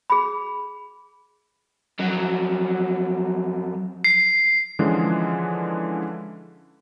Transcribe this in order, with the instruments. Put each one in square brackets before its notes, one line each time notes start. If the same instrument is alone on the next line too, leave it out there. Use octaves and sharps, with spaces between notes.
[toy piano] G#4 B5
[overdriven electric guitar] F2 F#3
[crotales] C7
[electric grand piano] D3 E3 F3 G#3 C#4